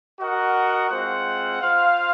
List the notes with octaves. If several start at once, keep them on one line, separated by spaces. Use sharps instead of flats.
F#4 A#4 D#5 F#5
G#3 C4 F4 C5 F#5
F4 C5 F5